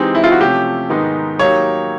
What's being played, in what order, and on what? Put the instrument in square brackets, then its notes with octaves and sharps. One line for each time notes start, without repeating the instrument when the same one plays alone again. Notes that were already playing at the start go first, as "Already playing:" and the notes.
Already playing: [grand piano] E3 G#3 C4 D#4 G4
[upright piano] E4
F4
F#4
[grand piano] C3 F3 A3 C#4 [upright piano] G4
[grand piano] G#2 D#3 G#3 B3 D#4
[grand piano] F#3 A#3 D#4 G4 [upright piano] C#5